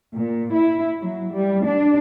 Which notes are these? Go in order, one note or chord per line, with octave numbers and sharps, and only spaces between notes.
A#2
E4
F#3
G3
D4